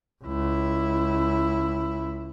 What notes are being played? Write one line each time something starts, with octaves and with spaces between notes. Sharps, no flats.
C#2 E4